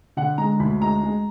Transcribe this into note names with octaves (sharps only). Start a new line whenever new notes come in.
D3 F#5
G#3 A#5
D2 B5
G#3 A#5
G#3